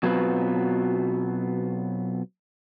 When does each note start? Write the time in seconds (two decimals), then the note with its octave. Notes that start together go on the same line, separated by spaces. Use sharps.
0.03 B2 F#3 B3 C4 F4 B4